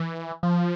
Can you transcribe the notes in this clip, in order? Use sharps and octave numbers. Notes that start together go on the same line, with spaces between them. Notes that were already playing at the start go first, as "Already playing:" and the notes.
Already playing: E3
F3